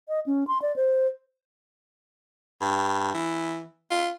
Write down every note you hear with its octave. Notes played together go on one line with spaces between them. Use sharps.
D#5
C#4
C6
D5
C5
G2
E3
F4